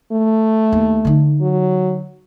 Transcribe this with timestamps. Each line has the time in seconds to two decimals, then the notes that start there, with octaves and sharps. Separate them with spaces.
0.12 A3
0.73 D#2
1.05 D3 D#4
1.41 F#3